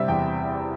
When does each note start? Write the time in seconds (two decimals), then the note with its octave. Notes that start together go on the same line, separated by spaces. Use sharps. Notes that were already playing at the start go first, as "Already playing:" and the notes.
Already playing: C3 G3 C4 E5
0.08 E2 G5